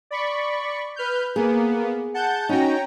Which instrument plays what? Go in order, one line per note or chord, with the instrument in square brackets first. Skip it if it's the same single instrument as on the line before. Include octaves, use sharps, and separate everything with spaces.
[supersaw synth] D5 B5 C#6
B4 F6 G6
[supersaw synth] A#3 B3 [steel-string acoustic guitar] G#4
[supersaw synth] F#5 A5 G6
[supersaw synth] C#4 G5 A#5 [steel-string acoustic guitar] D#4 F#4